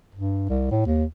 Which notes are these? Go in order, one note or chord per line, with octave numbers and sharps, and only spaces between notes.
G2
C2
A2
D#2